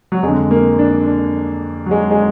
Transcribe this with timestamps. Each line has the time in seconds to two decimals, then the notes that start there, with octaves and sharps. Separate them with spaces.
0.12 F#3
0.23 F2 D3 G#3
0.51 A#3
0.79 D4
1.07 D4
1.86 F#3
1.91 G#3
2.11 G#3